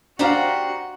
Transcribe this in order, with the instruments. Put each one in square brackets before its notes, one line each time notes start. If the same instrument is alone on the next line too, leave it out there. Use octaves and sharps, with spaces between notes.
[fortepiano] D4 F5 [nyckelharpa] F#4 F#5 [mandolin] G4 C5 A#5